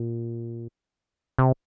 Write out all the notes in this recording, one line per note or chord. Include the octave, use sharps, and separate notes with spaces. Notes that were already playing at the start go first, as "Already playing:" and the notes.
Already playing: A#2
C3